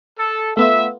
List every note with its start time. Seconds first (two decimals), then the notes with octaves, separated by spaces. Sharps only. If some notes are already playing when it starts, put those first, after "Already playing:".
0.18 A4
0.57 A3 B3 F4 E5